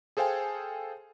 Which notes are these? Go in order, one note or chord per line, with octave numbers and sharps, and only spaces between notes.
G#4 A4 C5 F5 G5 G#5